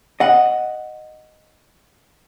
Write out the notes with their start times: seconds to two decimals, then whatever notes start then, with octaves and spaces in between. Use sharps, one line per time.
0.20 D#5 F#5